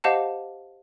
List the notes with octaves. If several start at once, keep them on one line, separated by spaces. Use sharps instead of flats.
G4 C5 D#5 F5 F#5 A5